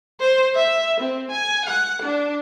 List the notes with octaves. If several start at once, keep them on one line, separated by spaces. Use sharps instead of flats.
C5
E5
C4
G#5
F#5
D4